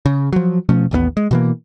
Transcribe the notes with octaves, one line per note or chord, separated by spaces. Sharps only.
C#3
F3 F#3
B2 F3 A3 C#4
A1 D#2 A3 B3
G#3
B2 E3 A#3